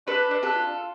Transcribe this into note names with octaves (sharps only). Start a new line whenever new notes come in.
D4 A4 B4
D4
A4 B4
F4